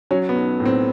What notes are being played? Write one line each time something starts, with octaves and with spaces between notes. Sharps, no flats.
F#3 C#4
B3
B1
A2
C4